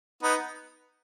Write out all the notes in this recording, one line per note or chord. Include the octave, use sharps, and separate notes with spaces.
B3 D#4